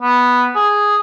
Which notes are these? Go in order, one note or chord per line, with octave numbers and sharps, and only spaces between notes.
B3
G#4